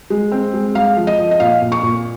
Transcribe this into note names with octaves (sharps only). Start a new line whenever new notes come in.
G#3
C4
G#3
G#3 F5
F3
D#5
F3
D#5
A#2 F5
A#2
C#6
A#2